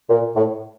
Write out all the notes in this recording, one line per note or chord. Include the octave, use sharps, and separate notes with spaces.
A#2
A2